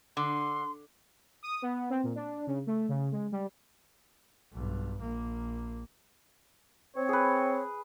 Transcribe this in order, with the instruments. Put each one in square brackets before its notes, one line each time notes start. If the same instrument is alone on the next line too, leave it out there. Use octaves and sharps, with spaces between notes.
[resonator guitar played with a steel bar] D3 [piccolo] C6
[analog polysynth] D#6
B3
C4
A#2
D4
C#3
A3
C#3
G#3
G3
[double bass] B1 G2
A#1 A#3
[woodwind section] C4 C#5
[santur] G#4 B4